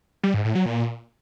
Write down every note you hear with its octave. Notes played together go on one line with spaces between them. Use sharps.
G3
G#2
A2
F#3
A#2